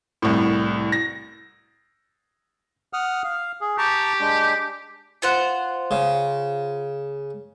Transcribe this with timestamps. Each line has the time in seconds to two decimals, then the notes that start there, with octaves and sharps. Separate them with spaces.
0.22 C2 A2
0.92 A#6
2.93 F#5 D#6 F6
3.24 F5
3.61 G#4
3.78 G4 A5 A#5 C#6
4.20 G#3 D4
5.22 F4 C5 F#5
5.91 C#3